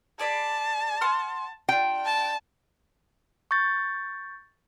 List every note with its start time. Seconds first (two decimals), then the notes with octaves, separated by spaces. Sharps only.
0.19 G#4 D5 A5 B5
1.01 F#5 C6 F6
1.69 D4 F4 G5
2.05 A5
3.51 C#6 G6 A6